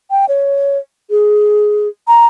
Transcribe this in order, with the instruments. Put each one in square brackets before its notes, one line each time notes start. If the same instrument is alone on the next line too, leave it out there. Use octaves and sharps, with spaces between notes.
[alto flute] G5
C#5
G#4
A#5